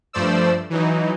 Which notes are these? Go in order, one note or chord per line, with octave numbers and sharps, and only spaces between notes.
G2 F3 A3 C5 D5 E6
E3 F#3 D#4